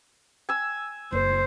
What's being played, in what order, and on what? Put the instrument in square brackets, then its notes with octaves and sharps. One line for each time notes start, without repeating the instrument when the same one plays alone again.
[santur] G#5 E6
[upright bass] F#1 [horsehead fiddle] C5